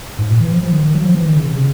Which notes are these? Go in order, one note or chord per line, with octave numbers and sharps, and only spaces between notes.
G#2
A#2
E3
F3
F3
D#3
D#3
F#3
F3
E3
D#3
C#3
C3
C#3